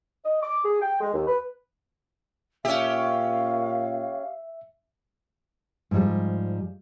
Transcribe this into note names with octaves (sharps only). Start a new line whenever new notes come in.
D#5
D6
G#4
G5
G#3
D#2
B4
A#2 C#4 G4 E5 F5
G#2 F3 G3